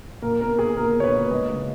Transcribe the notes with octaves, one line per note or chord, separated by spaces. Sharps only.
A#2 A#4
B3 A#4
A#2 G#4
A#2 A#4
B3
C#5
B4
A#2
G#3 D#5
C#3